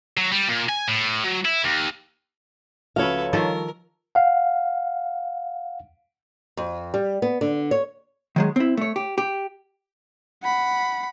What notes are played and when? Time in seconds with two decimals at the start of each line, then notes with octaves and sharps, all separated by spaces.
0.17 F#3
0.32 G3
0.48 A#2
0.69 G#5
0.88 A2
1.24 F#3
1.45 E4
1.64 D#2
2.96 C#2 F3 F#4 A4 B4 C#5 F5
3.33 D#3 F3 G3 A4 A#4 C#6
4.15 F5 F#5
6.57 F2
6.94 G3
7.22 B3
7.41 D3
7.71 C#5
8.36 D#3 F#3 G#3
8.56 C4 E4
8.77 A3 C#5
8.96 G4
9.18 G4
10.43 F#5 B5